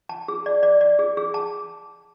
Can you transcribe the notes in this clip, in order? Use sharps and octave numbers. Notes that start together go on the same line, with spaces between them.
A5
G#4
D5
D5
D5
G#4
G#4
A5